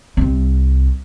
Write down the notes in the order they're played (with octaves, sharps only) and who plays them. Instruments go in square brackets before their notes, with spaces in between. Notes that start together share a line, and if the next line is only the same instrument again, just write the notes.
[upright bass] C2 C4